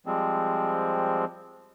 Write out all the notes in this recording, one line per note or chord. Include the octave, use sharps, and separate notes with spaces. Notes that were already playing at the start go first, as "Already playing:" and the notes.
F3 G3 G#3 C4